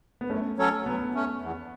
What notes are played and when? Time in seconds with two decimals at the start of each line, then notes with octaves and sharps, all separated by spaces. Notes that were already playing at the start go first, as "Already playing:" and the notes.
0.21 B3
0.30 F#2 A3 C#4
0.58 F#3 C#4 A4 C#5
0.86 F#3 B3
1.14 A3 C#4
1.42 E2